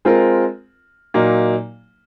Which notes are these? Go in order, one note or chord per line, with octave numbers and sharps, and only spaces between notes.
G#3 C4 F4 A#4
A#2 F#3 A#3 D#4